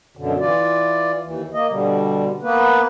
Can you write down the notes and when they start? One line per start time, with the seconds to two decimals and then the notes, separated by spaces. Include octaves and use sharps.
0.17 F#2 B2 D3
0.40 E3 F4 D5
1.23 D#2 E3
1.54 A#3 D#5
1.70 B2 D3 G3
2.42 A#3 B3 B4